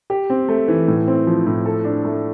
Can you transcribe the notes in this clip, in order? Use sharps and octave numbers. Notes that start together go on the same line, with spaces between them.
G4
C4
A3
E3
A2
C4
F3
A2
A4
D4
A3